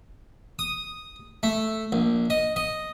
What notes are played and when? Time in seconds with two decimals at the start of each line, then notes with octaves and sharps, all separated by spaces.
0.59 D#6
1.43 A3
1.92 A#1
2.30 D#5
2.56 D#5